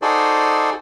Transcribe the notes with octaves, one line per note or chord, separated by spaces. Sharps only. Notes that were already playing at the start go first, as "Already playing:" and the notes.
D#4 F#4 G#4 A4 C5 D5